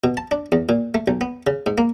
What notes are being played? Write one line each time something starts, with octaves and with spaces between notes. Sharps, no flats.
B2
A5
D4
E2
A#2
A3
B1
B3
C#3
G#2
A#3